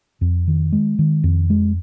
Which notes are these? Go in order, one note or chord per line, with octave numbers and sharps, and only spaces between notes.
F2
D#3
G#3
D#3
F2
G#3